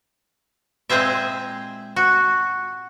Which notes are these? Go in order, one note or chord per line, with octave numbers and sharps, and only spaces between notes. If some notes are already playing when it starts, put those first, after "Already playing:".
A#2 G#3 C4 G#4 C5 E5
F#4